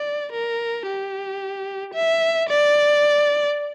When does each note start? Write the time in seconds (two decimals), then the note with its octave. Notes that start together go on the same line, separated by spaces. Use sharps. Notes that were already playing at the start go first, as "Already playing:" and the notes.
Already playing: D5
0.32 A#4
0.86 G4
1.94 E5
2.49 D5